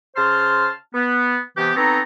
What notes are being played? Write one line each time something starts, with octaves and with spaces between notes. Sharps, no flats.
C#3 C5 A5 C6 F6
B3
C3 E3 B3 G4
B3 C4 D#4 A4 C#5 A#5